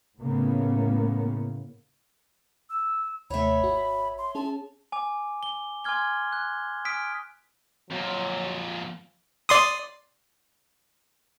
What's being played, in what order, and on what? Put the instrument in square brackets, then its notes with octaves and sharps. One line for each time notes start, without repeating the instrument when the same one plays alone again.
[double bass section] A2 C#3 A#3 B3
[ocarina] E6
[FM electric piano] D#2 C3 A3 [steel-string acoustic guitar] C#5 E5 [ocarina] B5
[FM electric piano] G#1 F#4
[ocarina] C6
[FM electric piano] C#4 G#4 [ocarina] A5
[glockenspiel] G#5 D6
G7
G#5 C6 D6 F6 G#6 G7
F#6
G#5 D#6 F6 B6 D7
[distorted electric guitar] F2 A#2 [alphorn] F#3
[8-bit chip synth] D5 C6 D#6